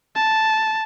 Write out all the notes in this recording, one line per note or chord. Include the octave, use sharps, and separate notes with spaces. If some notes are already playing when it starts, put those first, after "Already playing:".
A5